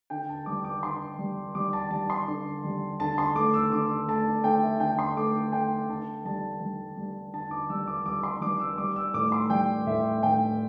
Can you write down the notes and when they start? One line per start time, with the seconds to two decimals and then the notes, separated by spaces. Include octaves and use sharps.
0.10 D3 G5
0.29 A5
0.46 G3 D6
0.65 D6
0.83 D3 C6
1.19 G3
1.55 G3 D6
1.73 A5
1.91 G3 A5
2.10 C6
2.28 D3
2.64 G3
3.00 D3 A5
3.18 C6
3.36 A3 D6
3.54 E6
3.72 D3 D6
4.08 A3 A5
4.44 A3 G5
4.63 E5
4.80 D3 G5
4.99 C6
5.17 A3 D6
5.52 A3 G5
5.89 D3 A5
6.25 G3 A5
6.60 G3
6.97 G3
7.33 D3 A5
7.51 D6
7.70 G3 E6
7.87 D6
8.06 G3 D6
8.23 C6
8.41 G3 D6
8.60 E6
8.78 G3 D6
8.96 E6
9.14 A2 D6
9.32 C6
9.50 G3 G5
9.86 A2 E5
10.23 A2 G5